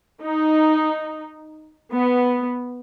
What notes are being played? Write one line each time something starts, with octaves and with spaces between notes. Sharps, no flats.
D#4
B3